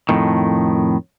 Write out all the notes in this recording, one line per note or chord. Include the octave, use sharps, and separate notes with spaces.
F2 A2 D#3